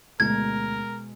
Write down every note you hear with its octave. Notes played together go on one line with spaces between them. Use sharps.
D2 B2 G#3 A#4 G#6